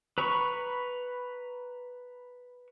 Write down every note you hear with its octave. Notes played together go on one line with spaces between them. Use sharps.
B4 A#5 B5 C#6